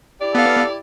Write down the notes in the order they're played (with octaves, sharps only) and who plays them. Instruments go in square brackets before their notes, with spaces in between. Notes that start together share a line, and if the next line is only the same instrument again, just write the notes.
[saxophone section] E4 G4 D5
[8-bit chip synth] B3 F5 [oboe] A4